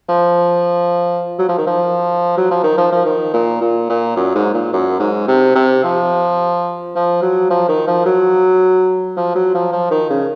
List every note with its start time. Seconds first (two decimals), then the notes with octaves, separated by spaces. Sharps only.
0.09 F3
1.38 F#3
1.49 F3
1.58 D#3
1.67 F3
2.37 F#3
2.51 F3
2.63 D#3
2.77 F3
2.92 F3
3.06 D#3
3.33 A#2
3.61 A#2
3.89 A#2
4.16 F#2
4.35 G#2
4.54 A#2
4.73 F#2
5.00 G#2
5.27 C3
5.55 C3
5.83 F3
6.95 F3
7.22 F#3
7.50 F3
7.68 D#3
7.87 F3
8.06 F#3
9.17 F3
9.35 F#3
9.54 F3
9.72 F3
9.90 D#3
10.10 C#3